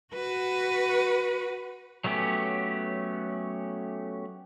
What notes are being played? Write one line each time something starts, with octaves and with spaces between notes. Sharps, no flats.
F#4 B4
F#3 A3 B3 C#4 G4